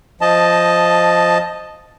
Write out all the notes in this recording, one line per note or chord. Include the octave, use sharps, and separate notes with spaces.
F3 D#5 A5